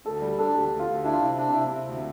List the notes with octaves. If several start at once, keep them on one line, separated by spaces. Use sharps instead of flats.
D2 A4
G3 G4
D4 A4
D2 G4
D2
F4
D2
D4 E4
F4
C3 E4
D4
C3 E4
C3
D2